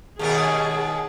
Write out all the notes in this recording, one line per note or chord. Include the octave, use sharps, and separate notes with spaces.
D#2 B2 G#4 A#4